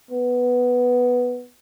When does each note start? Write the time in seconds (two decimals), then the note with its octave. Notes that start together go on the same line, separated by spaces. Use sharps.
0.11 B3